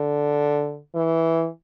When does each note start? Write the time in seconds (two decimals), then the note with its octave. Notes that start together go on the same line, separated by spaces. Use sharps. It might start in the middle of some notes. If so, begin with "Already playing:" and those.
Already playing: D3
0.95 E3